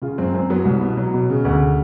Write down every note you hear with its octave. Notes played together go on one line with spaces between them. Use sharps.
C#3 F4
F#2 C4
F#2 C4
F#3 B3
C2
B2
F#3
B2
C#3
D2
C#3